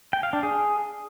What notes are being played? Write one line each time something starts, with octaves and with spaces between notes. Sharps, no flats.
G5
F5
D4
G#4